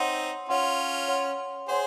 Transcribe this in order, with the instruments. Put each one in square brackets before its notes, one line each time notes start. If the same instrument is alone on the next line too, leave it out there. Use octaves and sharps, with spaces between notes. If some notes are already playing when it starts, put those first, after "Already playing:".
Already playing: [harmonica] C4 D#4 [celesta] C#5 F#5 C6
[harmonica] C#4 F4 [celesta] C#5 F#5 C6
[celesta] C#5 F#5 C6
[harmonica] G#4 C5 [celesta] C#5 F#5 C6